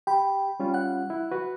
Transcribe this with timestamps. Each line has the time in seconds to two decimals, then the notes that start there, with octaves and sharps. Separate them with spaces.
0.07 G4 G5 B5
0.60 G3 C#4 F4
0.74 F#5 F#6
1.10 E4
1.32 F#4 B4